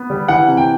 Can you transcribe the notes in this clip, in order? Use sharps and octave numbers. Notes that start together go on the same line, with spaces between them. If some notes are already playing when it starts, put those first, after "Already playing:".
Already playing: B3
G3
E3 F#5
C3
G5